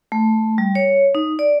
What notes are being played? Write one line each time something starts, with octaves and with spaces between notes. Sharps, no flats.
A3
G3
C#5
D#4
D5